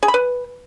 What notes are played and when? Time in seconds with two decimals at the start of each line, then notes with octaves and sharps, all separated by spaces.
0.03 G#4
0.08 B5
0.14 B4